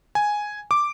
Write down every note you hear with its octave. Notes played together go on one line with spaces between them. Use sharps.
G#5
D6